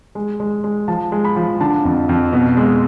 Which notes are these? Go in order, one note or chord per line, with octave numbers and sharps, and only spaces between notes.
G#3
G#3
G#3
F3 A5
G#3
B5
F3
D3 A5
F2
F2
B2
G#3